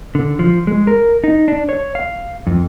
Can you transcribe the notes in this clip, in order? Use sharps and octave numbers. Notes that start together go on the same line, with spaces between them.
D3
F3
G#3
A#4
D#4
D4
C#5
F5
F2